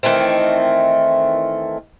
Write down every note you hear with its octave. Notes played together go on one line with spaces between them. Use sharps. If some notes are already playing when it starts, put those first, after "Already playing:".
D#3 E3 A3 C4